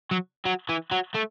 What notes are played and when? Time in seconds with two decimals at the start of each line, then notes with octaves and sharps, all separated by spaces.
0.11 F#3
0.45 F#3
0.69 E3
0.92 F#3
1.15 A3